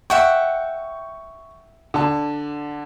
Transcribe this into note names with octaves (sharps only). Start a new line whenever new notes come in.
E5 F#5 G5 C#6
D3 A5